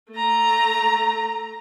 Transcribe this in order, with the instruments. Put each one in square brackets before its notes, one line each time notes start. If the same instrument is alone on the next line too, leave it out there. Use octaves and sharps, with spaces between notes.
[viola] A3 A#5